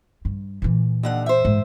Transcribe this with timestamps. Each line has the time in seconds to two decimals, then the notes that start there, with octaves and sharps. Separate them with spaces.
0.25 G2
0.62 A#2 E3
1.03 D#2 D3 F#5
1.26 C5 E5
1.45 G#2